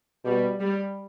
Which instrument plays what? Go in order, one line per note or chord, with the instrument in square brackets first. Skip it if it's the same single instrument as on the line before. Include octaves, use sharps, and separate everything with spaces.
[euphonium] B2 [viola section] G3
[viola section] G3